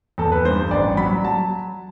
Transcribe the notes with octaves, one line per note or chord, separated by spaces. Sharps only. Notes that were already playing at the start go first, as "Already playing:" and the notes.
E2 A4
B4
G2 C5
A1 D5
F#3 B5
F#3 A5